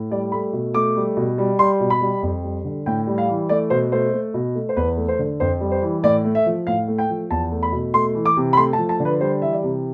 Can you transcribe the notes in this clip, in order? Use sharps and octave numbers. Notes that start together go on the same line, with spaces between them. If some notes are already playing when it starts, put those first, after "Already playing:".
Already playing: A2
G3 D5
A3 B5
B2
A3 D6
G3
B2
G3
G3 C6
B2
B5
G3
F2
G3
D3
A2 G5
G3
F5
E3
A3 D5
B2 C5
A3 C5
A3
B2
A3
C5
E2 B4
A3
C5
D3
F2 C5
G3
C5
E3
A2 D5
A3
E5
F3
A2 F5
A3
G5
F3
E2 A5
A3
B5
B2
A3 C6
E3
D6
C3
B5
A3 C6
A5
F3
A5
D3
B4
G3 C5
E3 E5
D5
C3